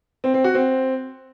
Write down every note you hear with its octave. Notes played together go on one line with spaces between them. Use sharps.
C4
C4
F#4
C4